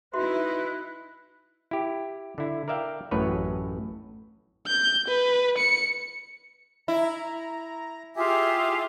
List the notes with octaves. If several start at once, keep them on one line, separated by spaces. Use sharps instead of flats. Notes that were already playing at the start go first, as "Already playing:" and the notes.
D#4 E4 F#4 B4 E5 C6 F#6
E4 G4
D3 E4
A#4 D5 E5 F5 G5
A1 F#2 A2 B4 C#5
G6
B4
C#7
E4 A#5
F4 G4 G#4 E5 D6